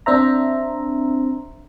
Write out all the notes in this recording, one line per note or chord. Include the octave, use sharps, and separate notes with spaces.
C4 D4 C5 E5 A#5